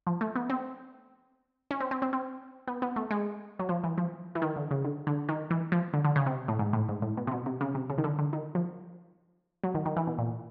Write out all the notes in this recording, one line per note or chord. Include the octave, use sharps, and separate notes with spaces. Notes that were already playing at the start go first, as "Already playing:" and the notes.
F3
A3
B3
C4
C#4
C4
C4
C4
C4
B3
B3
A3
G#3
F#3
F3
E3
F3
E3
D#3
D3
C#3
D3
D3
D#3
E3
F3
D3
D3
C#3
C3
A2
G#2
A2
G#2
A2
B2
C3
B2
C3
C#3
C3
C#3
D#3
D3
D3
D#3
F3
F#3
D#3
D#3
E3
B2
A#2